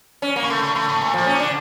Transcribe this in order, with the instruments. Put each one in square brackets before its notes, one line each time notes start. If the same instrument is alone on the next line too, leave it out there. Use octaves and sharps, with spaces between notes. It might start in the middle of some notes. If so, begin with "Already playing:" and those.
[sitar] C#4
A#3
[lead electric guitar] C#3
[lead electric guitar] D3 [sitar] A3
[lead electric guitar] C#3
[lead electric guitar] D3 [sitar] A3
[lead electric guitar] A2
[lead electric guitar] A#2 [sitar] A3
[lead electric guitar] A#2 [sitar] F3
[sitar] C#4
[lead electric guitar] D3 [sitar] D4